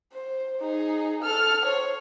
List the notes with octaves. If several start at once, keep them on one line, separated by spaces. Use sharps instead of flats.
C5
D#4 G#4
A4 F6
C5 C#5